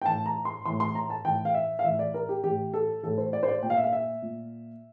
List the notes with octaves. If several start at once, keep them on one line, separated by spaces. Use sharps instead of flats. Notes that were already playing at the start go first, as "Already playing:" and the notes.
G5
A2 E3 A5
A#5
C6
A2 E3 C6
C6
A#5
A5
A2 E3 G5
F5
E5
F5
A2 E3 E5
D5
A#4
G4
A2 E3 G4
A4
A2 E3 A4
C5
D5
C5
D5
A#2 G5
F5
E5
F5
E5
A#2